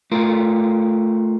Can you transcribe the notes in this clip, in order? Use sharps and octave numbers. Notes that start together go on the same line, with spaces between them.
A3 F4 A4 A#4